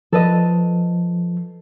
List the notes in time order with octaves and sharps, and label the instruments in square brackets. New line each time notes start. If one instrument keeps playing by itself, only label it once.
[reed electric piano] F3 [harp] A4 B4 D#5